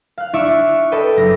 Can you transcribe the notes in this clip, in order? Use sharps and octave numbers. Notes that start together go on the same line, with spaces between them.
F5 F#6
D4 E4 D5 E5 C#6
A4 B4 D5 D#5 G5
F#1 A#6